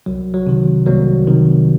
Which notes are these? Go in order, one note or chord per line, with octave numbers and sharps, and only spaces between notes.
C2 F#3
F#3
C3 D#3
C2 F#3 A#3
C3 D#3